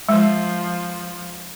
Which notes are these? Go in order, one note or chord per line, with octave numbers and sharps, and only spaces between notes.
F3 G#3